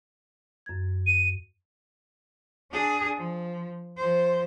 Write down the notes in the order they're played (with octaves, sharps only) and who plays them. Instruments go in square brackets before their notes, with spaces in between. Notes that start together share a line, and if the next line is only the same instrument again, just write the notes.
[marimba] F#2 G#6
[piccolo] D#7
[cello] D4 G#4
F3
F3 C5